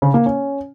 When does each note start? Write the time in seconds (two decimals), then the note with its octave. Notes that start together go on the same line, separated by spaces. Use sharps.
0.02 C#3
0.14 A#3
0.26 C#4